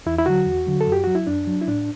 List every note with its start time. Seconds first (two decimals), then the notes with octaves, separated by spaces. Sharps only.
0.06 E2 E4
0.18 E4
0.26 D3 F#3 F#4
0.46 E2
0.67 D3 F#3
0.81 A4
0.87 F#2
0.92 G4
1.04 F#3 F#4
1.15 E4
1.27 F#2 D4
1.47 F#3
1.61 E4
1.68 A2 D4